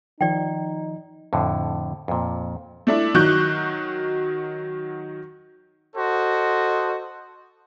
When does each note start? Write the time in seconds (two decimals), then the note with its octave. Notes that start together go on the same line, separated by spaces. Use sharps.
0.21 D#3 F3 D#4 D5 G5
1.33 F2 A2 D3
2.08 F2 A#2
2.87 A3 D4 E4
3.14 D#3 F#3 C#6 F#6 G6
5.96 F#4 A4 C5 D#5